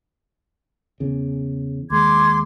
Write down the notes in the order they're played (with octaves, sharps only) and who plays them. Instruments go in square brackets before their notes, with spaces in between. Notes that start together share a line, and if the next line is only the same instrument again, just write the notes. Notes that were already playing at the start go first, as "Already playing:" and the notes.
[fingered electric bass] E2 C#3
[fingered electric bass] D#2 G#3 [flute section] C6 D6 G#6